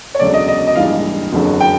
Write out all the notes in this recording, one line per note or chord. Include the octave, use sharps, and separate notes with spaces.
C#5
E1 D2 C#3 F#3 A3 D5
D#5
D#5
D#5
A#1 G#2 E3 G3 F5
F#1 F2 D3 F#3
G5